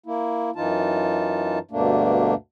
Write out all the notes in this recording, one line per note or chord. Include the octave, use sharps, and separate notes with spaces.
A#3 E4
F#2 E3 D#4 F4 A5
D2 G2 B2 A3 A#3 D4